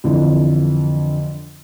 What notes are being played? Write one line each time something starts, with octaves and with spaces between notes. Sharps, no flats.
F2 D3 E3